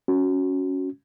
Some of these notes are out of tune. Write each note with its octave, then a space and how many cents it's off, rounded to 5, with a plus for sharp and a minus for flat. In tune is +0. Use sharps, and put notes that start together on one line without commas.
C#4 +0 F#4 -5